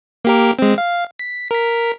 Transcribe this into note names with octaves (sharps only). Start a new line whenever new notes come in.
A#3 G4 A#4
G#3 C4
F5
B6
A#4 B6